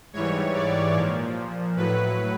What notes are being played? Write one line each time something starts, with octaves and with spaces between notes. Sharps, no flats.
G#2 E3 G3 C#5
D5
A#2 F3
A2 F#3 B4